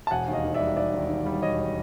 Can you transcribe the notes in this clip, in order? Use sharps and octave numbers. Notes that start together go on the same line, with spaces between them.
A5
E1 F#5 G#5
D#2
D#5 F5
D#3
D5 E5
G3
E1 D5 E5
D#2
D#3
G3
E1 C#5 D#5